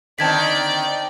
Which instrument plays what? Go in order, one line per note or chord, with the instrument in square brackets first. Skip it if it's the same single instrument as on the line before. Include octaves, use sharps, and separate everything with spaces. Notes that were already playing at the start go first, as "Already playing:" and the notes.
[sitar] D3 D#3 C4 [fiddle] D5 G5 [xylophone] A5 G#6 B6